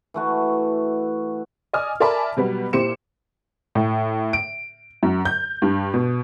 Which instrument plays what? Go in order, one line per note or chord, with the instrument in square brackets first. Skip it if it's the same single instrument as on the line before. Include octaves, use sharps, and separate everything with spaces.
[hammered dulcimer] E3 A3 F#4
[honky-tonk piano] D5 D#5 G#5 D#6 F6
A#4 D5 E5 G#5 A5 B5
B2 F#3 G3 B3
A#2 E4 G4 C5 C#7 E7
A2
D7
F#2
G6
G2
B2